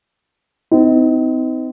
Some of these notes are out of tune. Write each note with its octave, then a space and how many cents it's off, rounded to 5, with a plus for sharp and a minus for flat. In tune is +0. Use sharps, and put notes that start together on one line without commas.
C4 -35 D#4 +25